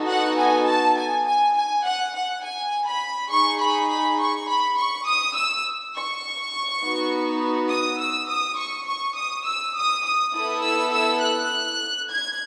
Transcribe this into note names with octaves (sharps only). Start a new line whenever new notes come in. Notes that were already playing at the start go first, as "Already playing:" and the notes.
Already playing: B3 D#4 F#4 A4
F#5
G#5
A5
G#5
G#5
G#5
F#5
F#5
G#5
B5
D#4 G#4 C#6
B5
B5
C#6
B5
C#6
D#6
E6
C#6
B3 D#4 F#4
D#6
E6
D#6
C#6
C#6
D#6
E6
D#6
D#6
B3 E4 A4 D#6
E6
E6
F#6
G#6